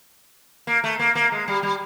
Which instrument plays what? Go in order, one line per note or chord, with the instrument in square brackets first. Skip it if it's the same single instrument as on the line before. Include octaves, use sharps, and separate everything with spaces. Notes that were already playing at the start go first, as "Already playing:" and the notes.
[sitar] A#3
A3
A#3
A#3
G#3
G3
G3